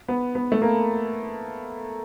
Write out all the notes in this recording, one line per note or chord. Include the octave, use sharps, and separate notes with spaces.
B3
B3
A3
A#3